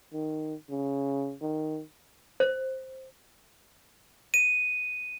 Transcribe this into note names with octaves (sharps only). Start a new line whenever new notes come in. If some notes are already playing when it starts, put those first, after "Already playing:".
D#3
C#3
D#3
C5
D#7